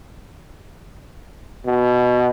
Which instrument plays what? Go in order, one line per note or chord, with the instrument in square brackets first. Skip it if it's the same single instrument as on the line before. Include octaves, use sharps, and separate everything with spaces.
[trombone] B2